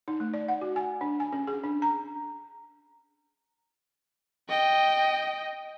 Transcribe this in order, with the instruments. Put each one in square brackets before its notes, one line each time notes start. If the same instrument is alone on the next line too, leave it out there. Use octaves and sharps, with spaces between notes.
[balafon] D#4
A3
D5
F#5
F#4
G#5
D4
G#5
C#4
G#4
D4
A#5
[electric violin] D#5 G5